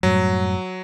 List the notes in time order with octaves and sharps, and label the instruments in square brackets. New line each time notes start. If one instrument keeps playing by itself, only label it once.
[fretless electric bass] F#2 A2 G3 [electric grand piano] F#3